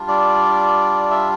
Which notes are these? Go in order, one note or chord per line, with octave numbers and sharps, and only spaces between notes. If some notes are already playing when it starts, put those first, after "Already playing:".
Already playing: G3 D4 F4
D5
E5